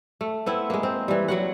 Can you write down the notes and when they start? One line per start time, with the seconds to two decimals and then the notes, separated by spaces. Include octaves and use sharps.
0.21 A3
0.46 B3 C4 E4
0.70 G#3 A#3
0.83 C4
1.08 E3 G3
1.28 F#3 F#4 F#5